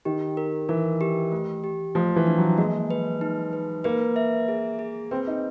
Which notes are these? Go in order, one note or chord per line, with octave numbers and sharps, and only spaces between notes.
D#3 G4
A#4
E3 A#4
G4
A3
G4
F3 A3
E3
D4
F#3
G#3 A#3
B4
D#4
B4
A#3 B4
E5
G#4
G#4
C4 B4
D#4